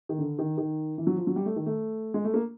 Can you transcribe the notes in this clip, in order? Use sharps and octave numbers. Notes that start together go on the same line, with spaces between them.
D#3
D3
D#3
D#3
E3
F#3
F3
F#3
G3
A3
D#3
A3
G#3
A3
A#3